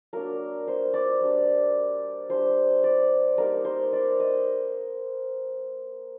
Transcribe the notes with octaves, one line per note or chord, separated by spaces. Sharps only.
F#3 A#3 D4 A#4
C5
D5
G3 D4
G3 D4 C5
D5
G3 A#3 D#4 A#4
C5
D5
D#5